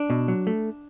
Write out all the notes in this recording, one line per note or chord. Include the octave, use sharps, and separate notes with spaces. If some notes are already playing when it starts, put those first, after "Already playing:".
Already playing: D4
B2
F#3
A3